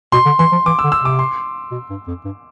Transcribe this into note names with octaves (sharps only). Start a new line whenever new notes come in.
B2 C6
D3
E3 C6
F3
E3 D6
E6
D3
E6
C3 D6
C6
B2
G2
F2
G2